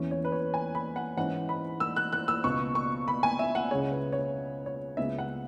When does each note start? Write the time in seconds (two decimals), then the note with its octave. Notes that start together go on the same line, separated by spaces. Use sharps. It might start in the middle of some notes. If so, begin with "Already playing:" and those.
Already playing: E2 E3 C#4
0.11 C#5
0.25 B4
0.32 C#5
0.54 G#5
0.75 B5
0.96 F#5
1.17 G#2 E3 C#4 F#5
1.49 B5
1.80 E6
1.96 F#6
2.13 F#6
2.28 E6
2.44 C#2 B2 B3 C#6
2.75 C#6
3.08 B5
3.23 G#5
3.39 E5
3.55 F#5
3.71 C#2 C#3 G#3 C#5
3.92 B4
4.12 C#5
4.66 C#5
4.97 C#2 C#3 G#3 B3 E5
5.19 F#5